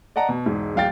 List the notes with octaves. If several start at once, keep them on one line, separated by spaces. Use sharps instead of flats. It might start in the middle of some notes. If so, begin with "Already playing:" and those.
D5 D#5 F#5 A5 A#5
B2
E1 G#2
D1 F5 G5 A6